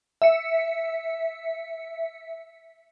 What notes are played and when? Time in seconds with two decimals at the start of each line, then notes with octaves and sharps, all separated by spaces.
0.22 E5 C#7